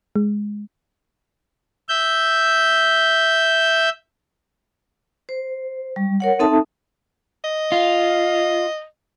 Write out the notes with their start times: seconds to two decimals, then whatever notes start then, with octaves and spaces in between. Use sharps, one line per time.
0.16 G#3
1.89 E5 G6
5.29 C5
5.96 G3
6.20 A#4 C#5 F#5
6.39 C4 D#4 A4 E5 A5 D#6
7.44 D#5
7.72 F4